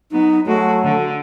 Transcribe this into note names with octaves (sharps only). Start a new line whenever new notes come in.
F#3 B3 D#4
F#3 G#3 A3 F#4
D3